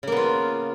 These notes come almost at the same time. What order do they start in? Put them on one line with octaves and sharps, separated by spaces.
C#3 A#3 B3 F4